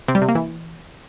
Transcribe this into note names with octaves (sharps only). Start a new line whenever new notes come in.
C3
G3
C3
A#3
E3